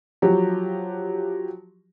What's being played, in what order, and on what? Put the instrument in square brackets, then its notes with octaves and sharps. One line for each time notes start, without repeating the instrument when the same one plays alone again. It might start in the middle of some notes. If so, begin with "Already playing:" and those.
[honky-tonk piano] F3 F#3 G4